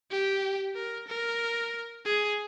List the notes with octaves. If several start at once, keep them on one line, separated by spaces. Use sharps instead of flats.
G4
A#4
A#4
G#4